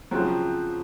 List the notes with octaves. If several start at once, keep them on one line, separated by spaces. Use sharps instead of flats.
C#3 F3 F#3 C4